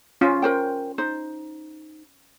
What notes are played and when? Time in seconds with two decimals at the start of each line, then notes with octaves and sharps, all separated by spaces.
0.21 C#4 F4
0.42 A#4 C5 G5
0.98 D#4 C5